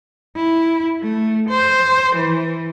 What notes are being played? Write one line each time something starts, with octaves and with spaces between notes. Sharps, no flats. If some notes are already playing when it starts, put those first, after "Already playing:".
E4
A3
C5
E3